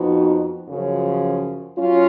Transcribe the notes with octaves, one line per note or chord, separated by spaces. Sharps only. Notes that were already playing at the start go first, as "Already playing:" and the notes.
Already playing: F2 F3 B3 D#4 F#4
F#2 C#3 F3
F#3 C#4 F4